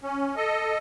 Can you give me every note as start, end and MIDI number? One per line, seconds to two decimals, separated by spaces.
0.03 0.36 61
0.36 0.78 69
0.36 0.78 75